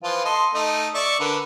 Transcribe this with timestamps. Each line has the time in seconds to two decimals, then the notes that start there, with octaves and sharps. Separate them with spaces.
0.03 E3 F3 F4
0.25 A4 D#5 C6
0.54 A3 D#4
0.94 D5 E5 C#6
1.20 D3 A#4 B4